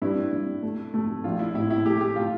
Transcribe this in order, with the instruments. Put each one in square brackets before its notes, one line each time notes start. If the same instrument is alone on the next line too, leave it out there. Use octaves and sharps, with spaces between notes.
[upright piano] G2 [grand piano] E4
[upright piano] G2
A3
A3
[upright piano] A#1 [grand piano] F4
[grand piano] E4
[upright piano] A2 [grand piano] E4
[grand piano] E4
[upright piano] A3 [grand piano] G4
[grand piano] G4
[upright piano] A3 [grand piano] F4